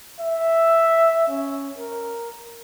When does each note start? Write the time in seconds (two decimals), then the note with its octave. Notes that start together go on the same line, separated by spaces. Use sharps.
0.20 E5
1.29 C#4
1.78 A#4